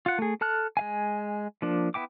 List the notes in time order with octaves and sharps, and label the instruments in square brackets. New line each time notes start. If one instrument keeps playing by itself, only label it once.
[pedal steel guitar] F4 F#5
A3 G#4
A4 A5 F6 F#6
G#3 F5 G#5
F3 A#3 D4
B3 E4 G5 D6